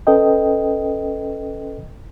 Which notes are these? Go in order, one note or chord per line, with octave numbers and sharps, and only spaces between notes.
C#4 A4 B4 D#5 G5